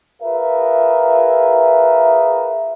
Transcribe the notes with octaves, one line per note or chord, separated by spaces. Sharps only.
F4 G#4 A#4 B4 E5